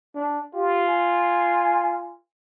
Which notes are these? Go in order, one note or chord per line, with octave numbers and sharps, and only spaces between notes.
D4
F4 G4
G#5